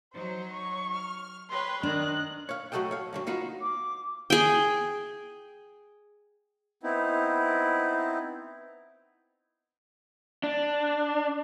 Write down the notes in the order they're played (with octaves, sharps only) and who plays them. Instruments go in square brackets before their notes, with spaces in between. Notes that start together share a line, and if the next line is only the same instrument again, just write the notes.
[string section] F#3 D#4 C#5 [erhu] C5
[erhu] C#6
[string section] F6
[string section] B4 C#5 G5 [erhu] C6
[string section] D#3 [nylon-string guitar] D4 [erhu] F#6
[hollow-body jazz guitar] C#5 F5
A2 F#3 F#4 A4 D#5 G5
C#5 F5
G2 D3 F#3
B3 D#4 F4 F#4
[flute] D6
[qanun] G#4 G5
[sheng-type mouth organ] B3 C4 D#4 E4
[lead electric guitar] D4